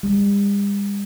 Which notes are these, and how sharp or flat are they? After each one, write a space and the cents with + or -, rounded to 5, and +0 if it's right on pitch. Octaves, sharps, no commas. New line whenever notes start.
G3 +45